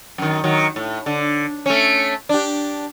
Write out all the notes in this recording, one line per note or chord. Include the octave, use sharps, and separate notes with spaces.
F#2 D#3
D#3 F#3
A2
D3
A3 C#4
D4 G4